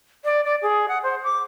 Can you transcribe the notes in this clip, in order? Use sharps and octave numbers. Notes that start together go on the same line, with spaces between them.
D5
D5
G#4
F#5
C5
D6